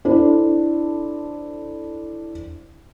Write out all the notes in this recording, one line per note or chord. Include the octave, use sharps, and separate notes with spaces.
D4 E4 A4 C5